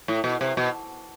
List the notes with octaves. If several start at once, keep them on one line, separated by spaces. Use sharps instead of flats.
A2
B2
C3
B2